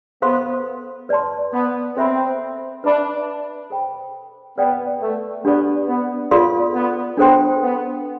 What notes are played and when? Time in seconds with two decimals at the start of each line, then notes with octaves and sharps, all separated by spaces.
0.22 B3 A4 C5 F5 C6
1.09 B4 D5 A5 C6
1.53 B3
1.96 C4 A4 C5 E5 B5
2.84 D4 B4 E5 B5
3.70 A4 C5 G5 B5
4.58 B3 B4 D5 G5
5.01 A3
5.44 B3 D4 G4 B4 D5
5.88 B3
6.31 B3 F4 A4 D5 F5 C6
6.74 B3
7.17 B3 D4 A4 C5 G5 C6
7.61 B3